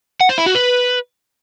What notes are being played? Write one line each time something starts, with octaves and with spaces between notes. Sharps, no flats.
F#5
C5
E4
F#4
B4